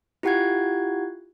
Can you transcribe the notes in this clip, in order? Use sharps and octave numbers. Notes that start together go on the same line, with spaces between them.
E4 F4 G4 F#5 F#6 G#6